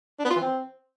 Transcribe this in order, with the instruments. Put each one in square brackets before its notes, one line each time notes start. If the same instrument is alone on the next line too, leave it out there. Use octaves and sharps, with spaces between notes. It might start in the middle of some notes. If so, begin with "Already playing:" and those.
[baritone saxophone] D4
B3
F4
E3
C4